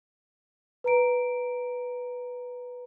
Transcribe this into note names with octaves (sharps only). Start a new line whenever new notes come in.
B4 A#5 D7